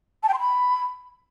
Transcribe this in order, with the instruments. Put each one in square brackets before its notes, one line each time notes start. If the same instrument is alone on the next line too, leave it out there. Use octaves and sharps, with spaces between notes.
[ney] A5
G5
C6
B5